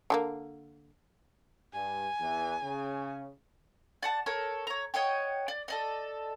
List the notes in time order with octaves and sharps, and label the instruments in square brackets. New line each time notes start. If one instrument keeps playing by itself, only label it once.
[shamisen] D3 G#3 A#3
[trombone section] G2 [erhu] G#5
[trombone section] E2 E3
C#3
[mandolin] D5 F#5 A5
A4 A#4 C#5
C#5 A#5
C#5 D#5 F#5 G5
D5
A4 D5 D#5